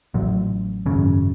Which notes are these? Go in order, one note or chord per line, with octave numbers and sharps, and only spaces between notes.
A1 A2 F#3
G#1 F#2 C#3